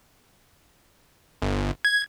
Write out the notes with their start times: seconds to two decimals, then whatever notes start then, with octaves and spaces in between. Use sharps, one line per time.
1.42 G1
1.85 G#6